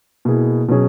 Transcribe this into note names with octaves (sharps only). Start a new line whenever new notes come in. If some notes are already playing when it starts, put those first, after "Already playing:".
B2 A#3 E4 G#4
B2 F#3 C#4 G#4